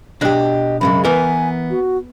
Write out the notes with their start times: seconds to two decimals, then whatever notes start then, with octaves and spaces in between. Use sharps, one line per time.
0.21 B2 D4 G4 D#5
0.81 F#2 C#3 G#3 B5
1.05 E3 B3 A#4 G#5
1.70 F#4